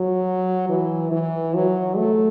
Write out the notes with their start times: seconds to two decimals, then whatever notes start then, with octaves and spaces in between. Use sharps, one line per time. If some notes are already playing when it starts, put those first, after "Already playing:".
Already playing: F#3
0.69 E3
1.12 E3
1.55 F#3
1.97 A3